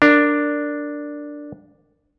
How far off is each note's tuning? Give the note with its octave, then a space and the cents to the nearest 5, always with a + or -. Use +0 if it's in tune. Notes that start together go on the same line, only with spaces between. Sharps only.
D4 +0 A#4 -15